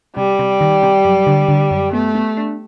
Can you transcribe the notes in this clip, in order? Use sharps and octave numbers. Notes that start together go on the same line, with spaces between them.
C3 G3
C3
D#3
C3
F#2
D3
D3
F#2
A3 B3
B3
D4